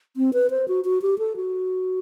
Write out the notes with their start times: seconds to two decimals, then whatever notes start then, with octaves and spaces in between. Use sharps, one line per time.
0.17 C4
0.33 B4
0.50 C5
0.68 F#4
0.85 F#4
1.02 G4
1.19 A4
1.36 F#4